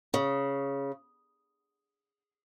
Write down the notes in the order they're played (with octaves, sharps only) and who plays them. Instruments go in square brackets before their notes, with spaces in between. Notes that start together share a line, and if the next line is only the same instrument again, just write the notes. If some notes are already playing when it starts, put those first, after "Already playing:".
[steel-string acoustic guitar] C#3